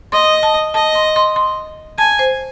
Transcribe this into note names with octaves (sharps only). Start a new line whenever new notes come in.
D#5 C6
A5
D#5 A5
C6
C6
C6
G#5 A5
C5